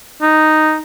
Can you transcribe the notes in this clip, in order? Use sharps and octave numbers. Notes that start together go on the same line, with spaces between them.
D#4